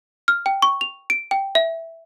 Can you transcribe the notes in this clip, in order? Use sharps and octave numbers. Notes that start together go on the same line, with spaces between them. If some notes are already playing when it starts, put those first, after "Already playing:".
F6
G5
C#6
F7
D7
G5
E5